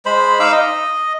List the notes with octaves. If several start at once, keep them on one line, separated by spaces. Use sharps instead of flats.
G#3 C5 B5
D#4 F5 D6 E6
D#5